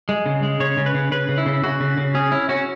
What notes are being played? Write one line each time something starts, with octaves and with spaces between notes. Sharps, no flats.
G#3
C#3
G#3
C#3 C#5
C#3
B4
C#3
C#3 B4
C#3
E4
C#3
C#3 F#4
C#3
C#3
C#4 G#4
C#4 E4
C#4 F#4